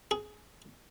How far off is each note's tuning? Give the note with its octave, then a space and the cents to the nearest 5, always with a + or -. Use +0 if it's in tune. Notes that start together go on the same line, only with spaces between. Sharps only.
G#4 +15